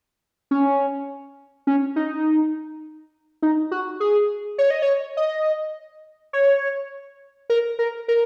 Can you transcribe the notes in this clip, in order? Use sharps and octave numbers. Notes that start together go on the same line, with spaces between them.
C#4
C#4
D#4
D#4
F#4
G#4
C#5
D#5
C#5
D#5
C#5
A#4
A#4
A#4